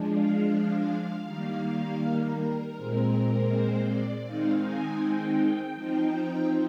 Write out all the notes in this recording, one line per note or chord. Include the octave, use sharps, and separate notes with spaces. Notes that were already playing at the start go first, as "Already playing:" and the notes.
Already playing: F3 G#3 D4
F5
D#3 G3 A#3
A#4
A#2 G#3 C4
C5
D5
D#3 G#3 C4 D#4 F5
G#5
G5
G5
F3 C4 D#4